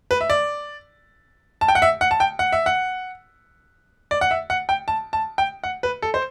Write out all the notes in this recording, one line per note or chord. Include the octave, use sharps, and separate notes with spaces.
B4
E5
D5
A5
G5
F#5
E5
F#5
A5
G5
F#5
E5
F#5
D5
F#5
E5
F#5
G5
A5
A5
G5
F#5
B4
A4
C5